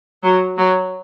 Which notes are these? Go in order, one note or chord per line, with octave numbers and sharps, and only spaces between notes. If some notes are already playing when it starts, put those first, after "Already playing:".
F#3
F#3